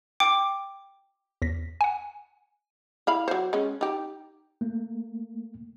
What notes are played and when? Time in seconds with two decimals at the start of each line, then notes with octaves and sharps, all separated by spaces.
0.20 G5 D6
1.42 E2 A#6 B6
1.81 F#5 G#5
3.07 E4 F5 B5
3.28 F#3 C5
3.53 G#3 C#4
3.81 D#4 G4
4.61 A3 A#3